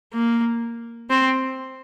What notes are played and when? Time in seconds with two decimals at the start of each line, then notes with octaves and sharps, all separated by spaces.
0.13 A#3
1.10 C4